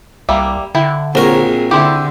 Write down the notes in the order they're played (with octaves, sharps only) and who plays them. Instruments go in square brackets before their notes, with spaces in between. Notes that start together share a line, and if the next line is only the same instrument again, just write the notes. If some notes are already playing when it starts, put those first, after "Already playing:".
[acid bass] C2 [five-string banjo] G3 A#3 E5
[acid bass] D3 [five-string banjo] E4 G5
[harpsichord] A#1 A#4 [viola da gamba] C4 G#4 [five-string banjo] F#4 C#5
[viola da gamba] D3 [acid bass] E4 [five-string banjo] G4 C5 E5